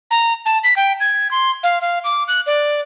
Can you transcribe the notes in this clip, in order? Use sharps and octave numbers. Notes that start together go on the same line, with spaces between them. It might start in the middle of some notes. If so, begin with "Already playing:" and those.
A#5
A5
B6
G5
G#6
C6
F5
F5
D6
F#6
D5